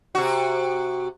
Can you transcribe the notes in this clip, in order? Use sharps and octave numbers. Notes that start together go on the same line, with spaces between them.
C3 F#4